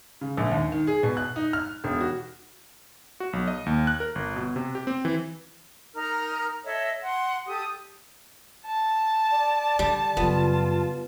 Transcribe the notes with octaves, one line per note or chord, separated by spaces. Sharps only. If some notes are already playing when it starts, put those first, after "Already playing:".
C#3
A#1
D#2
D#3
G#4
B2
F#6
D#4
F6
E1
F#4
F#4
B1
D#5
D#2
F#6
A#4
G1
B2
C3
G4
C4
E3
D#4 A#4 A#5 F6
A4 C#5 D#5 E5
F#5 C6
G4 A4 D#6 G6
A5
D5
D3 G3
F#2 C#3 B3 F4